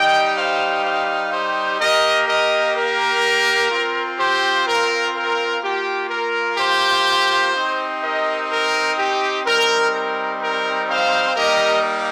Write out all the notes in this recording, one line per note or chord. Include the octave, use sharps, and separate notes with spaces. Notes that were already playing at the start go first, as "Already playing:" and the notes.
Already playing: G3 D#4 G4 D#5 G5
C5 F5
C5 F5
G4 C5
A#3 G4 A#4 D#5
A#4 D#5
A#4
C4 F4
G4 C5
A#4
A#4
A#3 F4 G4
A#4
G4 C5
C4 D#4 G4
A#4 D#5
A#4
G4
G3 C4 D#4 A#4
A#4
A#4
C5 F5
G3 A#3 D#4 G4 A#4 D#5